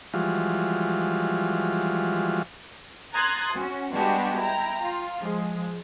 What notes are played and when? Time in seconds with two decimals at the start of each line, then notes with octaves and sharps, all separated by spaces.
0.14 E3 F3 G3 G#3 F4 F#4
3.14 A#5 C6 D#6 F#6 G#6 A6
3.53 C#4 F#4
3.92 G3 G#3 B3 D4 F#4 G4
4.41 E4 G5 A#5
4.82 F4
5.20 F3 G#3